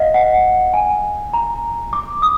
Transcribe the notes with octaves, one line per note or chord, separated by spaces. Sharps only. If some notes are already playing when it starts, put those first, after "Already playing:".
Already playing: D#5 F5 F#5
F#5
G#5
A#5
D6
D#6